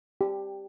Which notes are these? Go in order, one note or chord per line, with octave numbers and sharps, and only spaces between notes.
G4